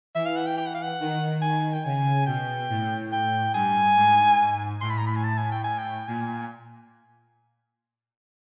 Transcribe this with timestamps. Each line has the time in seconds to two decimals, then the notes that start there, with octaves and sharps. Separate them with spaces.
0.15 E3 E5
0.26 F5
0.37 F#5
0.46 G5
0.57 G5
0.66 F#5
0.74 F5
0.83 F#5
1.00 D#3
1.42 G#5
1.73 G5
1.85 C#3 G#5
2.27 B2 G5
2.69 A2
3.12 G5
3.54 G2 G#5
3.97 G#2
4.81 A2 C6
4.90 B5
4.98 A#5
5.07 B5
5.16 G#5
5.24 A5
5.38 G#5
5.52 G5
5.64 G#5
5.78 G5
6.08 A#2 G#5